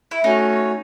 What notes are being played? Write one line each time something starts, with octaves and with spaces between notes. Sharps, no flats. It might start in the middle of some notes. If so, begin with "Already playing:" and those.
E4
A3 C#4 D#4 F#4 C#5